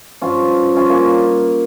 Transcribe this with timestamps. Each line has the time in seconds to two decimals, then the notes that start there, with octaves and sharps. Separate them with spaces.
0.22 G2 F3 C#4 F4
0.76 C#4 F4
0.90 A#3 C#4